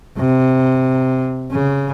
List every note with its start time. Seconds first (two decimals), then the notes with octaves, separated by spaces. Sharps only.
0.18 C3
1.51 C#3